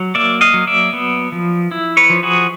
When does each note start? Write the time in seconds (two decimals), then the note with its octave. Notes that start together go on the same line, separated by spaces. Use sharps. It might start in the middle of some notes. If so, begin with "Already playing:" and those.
Already playing: F#3
0.15 A#3 D5 E5
0.41 D#5 F5
0.54 F#3
0.67 D5 E5
0.93 B3
1.32 F3
1.71 E4
1.97 B4 C#5
2.10 F3
2.23 F#4 G#4